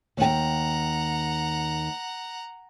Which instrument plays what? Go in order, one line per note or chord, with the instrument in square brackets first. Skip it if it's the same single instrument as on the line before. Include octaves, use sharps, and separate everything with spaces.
[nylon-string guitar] D#2 G5 [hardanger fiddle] F#5 A#5